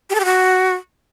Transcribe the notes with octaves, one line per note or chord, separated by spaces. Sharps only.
G4
A4
G4
F#4